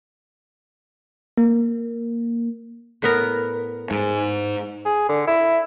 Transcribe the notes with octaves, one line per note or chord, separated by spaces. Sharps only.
A#3
A2 B3 A#4
G#2
G#4
D3
E4